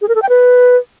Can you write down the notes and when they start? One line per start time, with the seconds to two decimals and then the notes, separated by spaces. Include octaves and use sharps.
0.01 G#4
0.08 A#4
0.15 A4
0.22 G5
0.29 B4